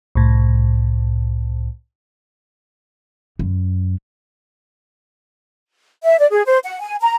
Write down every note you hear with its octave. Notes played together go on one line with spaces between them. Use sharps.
C2 A2
F#2
E5
D5
G#4
C5
F#5
G#5
A#5